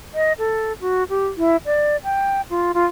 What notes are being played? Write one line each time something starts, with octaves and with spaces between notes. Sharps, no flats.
D#5
A4
F#4
G4
E4
D5
G5
F4
F4